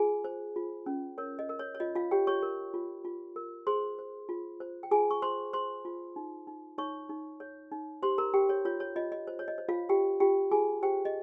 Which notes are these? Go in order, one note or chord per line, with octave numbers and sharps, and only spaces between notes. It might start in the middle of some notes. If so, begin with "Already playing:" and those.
Already playing: F4 G#4 G#5
C5
F4
C#4
A#4 C#5
D#5
A#4
C#5
C#5
F4 D#5
F4 F5
G4 C#5 G5
C#5 C#6
A#4
F4
F4
A#4
G#4 C5 C6
C5
F4
C5
G5
F4 G#4 G#5
C#6
C5 C6
C5 C6
F4
D#4
D#4
D#4 C#5 C#6
D#4
C#5
D#4
G4 C5 C6
A#4 A#5
G4 G5
C#5
F4 C#5
C#5
F4 D#5
D#5
C5
C#5
D#5
C5
F4 F5
F4 G4 G5
F4 G4 G5
F4 G#4 G#5
G4 C5 G5
D#5